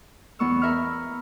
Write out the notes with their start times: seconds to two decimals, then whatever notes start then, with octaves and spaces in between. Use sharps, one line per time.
0.39 E2 B3 C#6 E6
0.62 A#4 E5 B5 F6